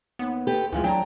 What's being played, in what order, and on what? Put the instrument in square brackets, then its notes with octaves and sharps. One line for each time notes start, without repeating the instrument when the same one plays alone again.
[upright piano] D#2 [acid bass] B3
[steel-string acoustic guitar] G4 A4 B4
[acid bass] D2 [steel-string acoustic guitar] C3 F3 G#3 [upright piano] E3
[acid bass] F#3 [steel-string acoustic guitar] D4 [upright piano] G5 A5 A#5